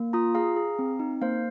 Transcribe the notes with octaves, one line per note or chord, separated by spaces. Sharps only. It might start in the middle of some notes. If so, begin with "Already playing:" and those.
Already playing: A#3
F4 A#5 D#6
G#4 F5 A#5
G#4
C4
D#4
A#3 C5 F5